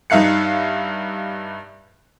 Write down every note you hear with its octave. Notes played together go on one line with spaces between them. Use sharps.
G2 D#4 E5 F5 F#6 C#7